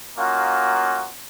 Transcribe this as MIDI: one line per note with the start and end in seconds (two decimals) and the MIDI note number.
0.18 1.07 58
0.18 1.07 61
0.18 1.07 63
0.18 1.07 65
0.18 1.07 66